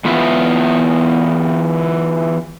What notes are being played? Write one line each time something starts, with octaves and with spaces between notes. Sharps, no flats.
E3 B3 F4 E5